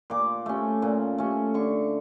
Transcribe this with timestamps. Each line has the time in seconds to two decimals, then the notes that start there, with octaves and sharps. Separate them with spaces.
0.10 A#2 D6
0.46 A3 C#4
0.82 A#2
1.18 A3 C#4
1.54 D3 C#6